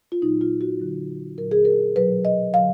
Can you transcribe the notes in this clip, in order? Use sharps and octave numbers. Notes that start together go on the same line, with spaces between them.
F4
A#2 F#3 D#4
F4
F#4
D3 F#3
A#2 F#3 A#4
G#4
A#4
B2 F#3 B4
D#5
D3 F#3 F5